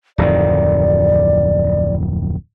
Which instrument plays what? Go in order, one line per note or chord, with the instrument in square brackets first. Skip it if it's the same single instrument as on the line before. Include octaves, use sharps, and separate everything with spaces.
[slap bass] D1 F2 D#3 [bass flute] D5